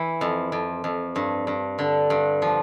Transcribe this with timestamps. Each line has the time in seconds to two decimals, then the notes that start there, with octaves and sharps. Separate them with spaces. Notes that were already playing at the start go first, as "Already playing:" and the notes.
Already playing: E3
0.21 F2
0.52 F2
0.84 F2
1.16 G2
1.47 G2
1.79 D3
2.10 G2
2.42 F3